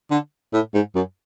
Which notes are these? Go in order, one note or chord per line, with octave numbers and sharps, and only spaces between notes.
D3
A2
G#2
F#2